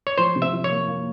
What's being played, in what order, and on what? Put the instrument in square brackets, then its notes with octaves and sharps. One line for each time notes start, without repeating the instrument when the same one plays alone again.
[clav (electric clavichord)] C#5
[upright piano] F3 [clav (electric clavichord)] C5
[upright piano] C3
[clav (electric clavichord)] E5
[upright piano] F3
[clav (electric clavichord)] C#5
[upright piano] A#3
A#3